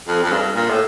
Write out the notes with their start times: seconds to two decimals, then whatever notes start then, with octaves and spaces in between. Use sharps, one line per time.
0.08 F2
0.23 F2
0.32 G2
0.55 A#2
0.70 A2